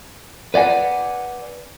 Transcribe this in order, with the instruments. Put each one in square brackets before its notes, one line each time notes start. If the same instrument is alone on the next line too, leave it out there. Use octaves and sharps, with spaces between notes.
[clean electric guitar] B4 D5 F#5 G#5